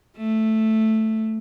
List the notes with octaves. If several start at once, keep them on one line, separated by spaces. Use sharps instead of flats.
A3